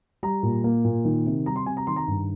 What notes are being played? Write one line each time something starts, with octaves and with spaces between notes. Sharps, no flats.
G3 A#5
A#2
A#3
A#2
D#3
C3
G3 A#5
C6
C3 G#5
A#5
D#3 C6
A#5
G2